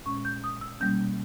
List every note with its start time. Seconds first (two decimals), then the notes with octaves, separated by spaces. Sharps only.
0.06 A#2 G#3 C#4 C#6
0.25 G6
0.44 D#6
0.61 E6
0.80 B2 G3 A#3 C#4 G6